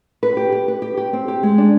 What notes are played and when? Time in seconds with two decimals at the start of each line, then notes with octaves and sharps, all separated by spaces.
0.23 B4
0.37 G4
0.52 G4
0.68 B4
0.82 G4
0.97 G4
1.13 C4
1.28 G4
1.43 G#3
1.58 D4